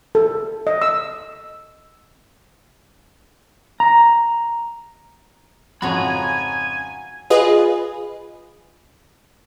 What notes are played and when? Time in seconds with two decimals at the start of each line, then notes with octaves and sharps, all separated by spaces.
0.15 A4
0.67 D#5
0.82 E6
3.80 A#5
5.82 F2 G#2 C#3 F#4 C#5 G#5 A#5 B5
7.30 F4 G#4 B4 D#5